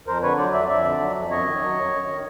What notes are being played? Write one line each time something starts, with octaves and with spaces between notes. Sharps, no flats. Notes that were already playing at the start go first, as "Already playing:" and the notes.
F2 A#4 C5
D3 B4 C#5
F#3 C5 D5
F2 D5 E5
F2 D5 E5
D3
F#3
F2
F#2 C#5 D#5
D#3
F#3
F#2
F#2
D#3